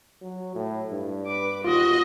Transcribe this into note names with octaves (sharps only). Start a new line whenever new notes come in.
F#3
A2
G2
B4 D6
D#2 F4 F#4 D#5